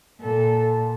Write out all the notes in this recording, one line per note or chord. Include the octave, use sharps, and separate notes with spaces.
A#2 A4